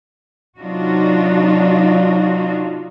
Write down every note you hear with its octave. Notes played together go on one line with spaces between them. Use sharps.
C3 F#3 D4 D#4 F4 F#4